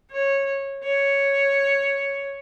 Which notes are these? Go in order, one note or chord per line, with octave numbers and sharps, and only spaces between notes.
C#5
C#5